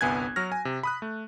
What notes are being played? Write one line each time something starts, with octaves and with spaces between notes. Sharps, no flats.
G1 C2 B3 G#5 F#6 G#6
F#3 F#4 F6 A#6
G#5
C3
B5 D#6 F#6
A3